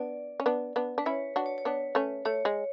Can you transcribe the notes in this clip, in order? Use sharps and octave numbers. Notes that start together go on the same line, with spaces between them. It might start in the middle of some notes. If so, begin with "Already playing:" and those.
Already playing: B3 D4 D5
C#4
B3 D4
B3 D4
D4 B4
C#4 E4 C#5
D4 F#4
C#5
C#5
B3 D4 B4
A3 C#4
A3 C#5
G#3